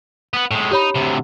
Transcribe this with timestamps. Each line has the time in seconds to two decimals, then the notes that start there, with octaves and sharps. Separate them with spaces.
0.34 B3 B4
0.51 A2 G#3
0.71 D#4 G4 C#5 B5
0.95 D2 C3